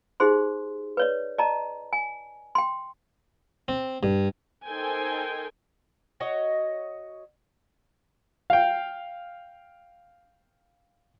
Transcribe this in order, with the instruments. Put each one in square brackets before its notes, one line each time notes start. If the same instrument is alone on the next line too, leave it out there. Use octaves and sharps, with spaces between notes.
[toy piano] D#4 G4 G#4 C5 C6
B4 C#5 D5
D5 D#5 A5 A#5
G#5
G5 C6
[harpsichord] C4
G2
[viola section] D#4 A4 A#4 C5 G5 G#5
[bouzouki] F#4 C#5 D#5
[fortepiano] F5 G5